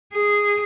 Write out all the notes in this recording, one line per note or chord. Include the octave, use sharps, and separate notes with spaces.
G#4